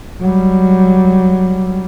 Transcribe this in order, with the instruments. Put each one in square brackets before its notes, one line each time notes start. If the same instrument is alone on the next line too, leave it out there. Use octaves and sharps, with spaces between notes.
[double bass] F#3 G3